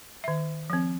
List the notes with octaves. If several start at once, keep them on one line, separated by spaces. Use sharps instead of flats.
D#3 E5
F3 C4